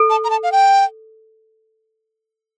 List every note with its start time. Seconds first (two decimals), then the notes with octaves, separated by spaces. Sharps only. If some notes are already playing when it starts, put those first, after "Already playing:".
Already playing: A4
0.10 A5
0.24 A#5
0.30 A5
0.43 F5
0.52 G5